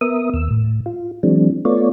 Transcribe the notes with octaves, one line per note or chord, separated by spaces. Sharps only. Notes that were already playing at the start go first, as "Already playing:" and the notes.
B3 A#4 E5 D#6
D#2 E6
A2
F4
E3 F#3 G#3 C4 D4
A3 B3 F4 C#5 D5